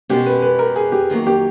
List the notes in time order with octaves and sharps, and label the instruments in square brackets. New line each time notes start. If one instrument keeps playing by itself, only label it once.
[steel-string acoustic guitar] B2 G#3 C#4 [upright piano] G4
[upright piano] B4
B4
A#4
G#4
G4
[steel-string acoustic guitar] F#2 D#3 F#3 A#3
[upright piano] G4